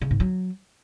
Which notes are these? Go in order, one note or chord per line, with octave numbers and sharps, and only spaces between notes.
C#3
G#2
F#3